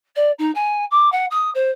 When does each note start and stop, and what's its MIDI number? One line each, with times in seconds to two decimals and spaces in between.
0.15 0.31 74
0.38 0.51 63
0.54 0.85 80
0.91 1.09 86
1.12 1.25 78
1.31 1.50 87
1.54 1.71 72